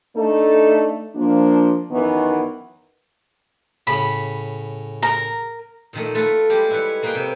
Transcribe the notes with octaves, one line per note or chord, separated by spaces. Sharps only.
A3 D4 D#4 A4
F3 A#3 D4
F#2 D#3 E3 B3
A2 C#3 B5
A#4 A#5
A#2 D#3 A3
A3 F4 A4 B4
G3 G#3 G4
E4 B4 C#5
A#3 G#4 B4 F5 G5
C3